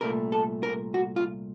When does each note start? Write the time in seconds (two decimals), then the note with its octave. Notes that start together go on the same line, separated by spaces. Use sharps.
0.01 C2 A#2 A3 A#4
0.32 A4
0.63 A#4
0.94 F#4
1.16 F4